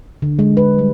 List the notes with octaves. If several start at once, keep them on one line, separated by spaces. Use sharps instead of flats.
D3
G#3
B4
G3